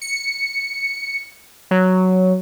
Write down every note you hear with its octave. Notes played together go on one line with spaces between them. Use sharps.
C#7
F#3